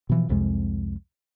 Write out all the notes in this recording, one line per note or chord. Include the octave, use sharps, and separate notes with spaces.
B2 E3 F3
C2 F2 C3 G#3